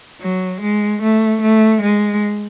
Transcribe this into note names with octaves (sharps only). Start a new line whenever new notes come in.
F#3
G#3
A3
A3
G#3